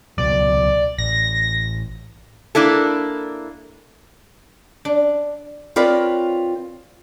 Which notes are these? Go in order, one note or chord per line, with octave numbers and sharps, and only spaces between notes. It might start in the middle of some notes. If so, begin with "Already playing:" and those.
C#2 B2 F#3 D5
A1 A#6
A#3 D4 E4 A4
D4
C4 F4 A#4 B4 C#5 D5